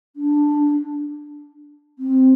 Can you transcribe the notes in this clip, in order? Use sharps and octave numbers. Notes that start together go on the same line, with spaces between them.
D4
C4